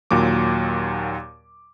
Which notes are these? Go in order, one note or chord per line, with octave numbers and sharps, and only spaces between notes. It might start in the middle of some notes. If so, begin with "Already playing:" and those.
D#2 A#2 F#3 D6